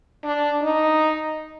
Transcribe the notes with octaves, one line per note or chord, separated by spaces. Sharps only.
D4
D#4